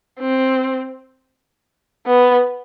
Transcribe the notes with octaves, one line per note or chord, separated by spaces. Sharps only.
C4
B3